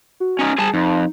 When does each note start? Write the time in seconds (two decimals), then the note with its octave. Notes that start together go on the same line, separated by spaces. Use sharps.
0.20 F#4
0.39 C#4 D#4
0.58 G3 G#4 G#5 A5
0.74 F2 D#4